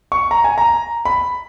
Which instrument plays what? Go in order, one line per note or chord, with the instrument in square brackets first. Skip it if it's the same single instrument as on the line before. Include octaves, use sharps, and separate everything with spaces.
[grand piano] C#6
A#5
G#5
A#5
B5